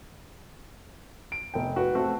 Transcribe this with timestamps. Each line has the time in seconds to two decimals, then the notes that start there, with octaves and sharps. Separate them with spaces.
1.32 D7
1.54 F1 G5
1.76 F#4 B4
1.95 A3 C4 F#4